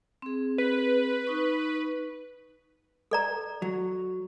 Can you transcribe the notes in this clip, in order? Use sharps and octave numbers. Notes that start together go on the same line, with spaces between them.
C4 G#4
B4
D#4 C#6
A4 D5 A#5
F#3